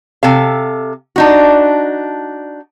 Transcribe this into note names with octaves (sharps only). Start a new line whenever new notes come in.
C3 A4 F5
D4 D#4 F#4